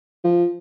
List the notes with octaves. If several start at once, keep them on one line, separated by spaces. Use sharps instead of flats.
F3